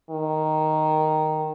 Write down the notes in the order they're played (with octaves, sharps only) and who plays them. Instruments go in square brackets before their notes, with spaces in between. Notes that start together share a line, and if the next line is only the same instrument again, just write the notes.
[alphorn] D#3